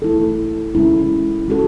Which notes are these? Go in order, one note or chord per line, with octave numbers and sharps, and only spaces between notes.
A3 E4 A4
C#3 G#3 C#4 E4 A4
G#3 C#4 F#4 A4